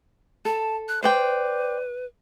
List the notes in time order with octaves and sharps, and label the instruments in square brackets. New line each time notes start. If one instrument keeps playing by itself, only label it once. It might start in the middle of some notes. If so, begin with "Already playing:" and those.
[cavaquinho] A4 [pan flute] A5
[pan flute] F#6
[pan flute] B4 [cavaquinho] C5 D5 G5